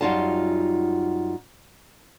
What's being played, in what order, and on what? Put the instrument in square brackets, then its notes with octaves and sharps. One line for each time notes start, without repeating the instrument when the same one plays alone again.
[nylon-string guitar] F#2 G3 D#4 F4 F5 A5